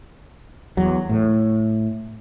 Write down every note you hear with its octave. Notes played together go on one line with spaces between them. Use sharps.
E2 F#3
A2